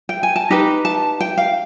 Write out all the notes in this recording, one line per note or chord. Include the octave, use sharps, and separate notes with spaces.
G5
G#5
A5
D#4 G4 B4 A#5
A5
G5
F5